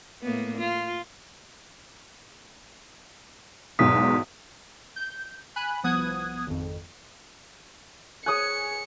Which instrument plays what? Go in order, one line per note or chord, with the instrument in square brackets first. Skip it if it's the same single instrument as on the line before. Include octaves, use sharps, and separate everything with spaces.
[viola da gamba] A2 A#3 B3
F4
[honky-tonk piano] B1 E2 G#2 [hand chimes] D#6 B6
[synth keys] G6
G#5 B5 F#6
C2 F3 B3 D#6 F#6 G#6
G#1 F2
[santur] G#4 C#5 G#5 [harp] D#6 F#6 [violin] C#7